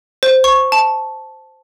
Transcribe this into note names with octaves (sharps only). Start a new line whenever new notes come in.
C5
C#6
A5